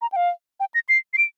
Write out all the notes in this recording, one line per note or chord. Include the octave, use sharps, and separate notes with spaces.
A#5
G5
F5
G5
A#6
C7
C7
D7